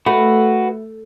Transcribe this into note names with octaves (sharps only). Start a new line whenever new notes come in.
A3 F#4 B4